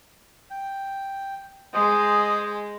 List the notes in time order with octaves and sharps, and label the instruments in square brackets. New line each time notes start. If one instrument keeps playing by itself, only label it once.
[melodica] G5
[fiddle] G#3 [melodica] G#4 C5 D#5